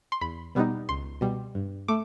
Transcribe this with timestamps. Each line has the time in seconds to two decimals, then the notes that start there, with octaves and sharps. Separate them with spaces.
0.12 C6
0.21 E2 B5
0.55 B2 G3 B3 D#4
0.89 C#2 C6
1.21 B2 G3
1.55 G2
1.88 A3 D6